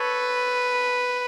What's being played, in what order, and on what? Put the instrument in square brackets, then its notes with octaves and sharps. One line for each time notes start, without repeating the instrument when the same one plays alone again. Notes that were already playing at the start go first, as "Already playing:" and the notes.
Already playing: [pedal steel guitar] A4 C#5 [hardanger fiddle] B4